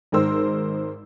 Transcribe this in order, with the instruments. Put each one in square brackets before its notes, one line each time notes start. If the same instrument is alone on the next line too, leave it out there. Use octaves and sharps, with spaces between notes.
[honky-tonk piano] G#1 G#2 G#3 A#4 C5 E6